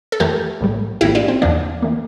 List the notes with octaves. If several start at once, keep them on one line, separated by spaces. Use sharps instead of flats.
A4
F2 E3 A3 G4 A#4
A#1 A2 G3
A#1 A2 E3 A#3 E4 G4
D4 F4
C4
E2 D3 F3 A#3 D4
E3 A#3